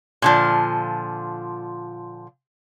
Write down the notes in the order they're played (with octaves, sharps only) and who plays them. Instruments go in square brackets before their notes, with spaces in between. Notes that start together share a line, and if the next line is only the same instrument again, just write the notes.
[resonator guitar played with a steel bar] A#2 D3 F3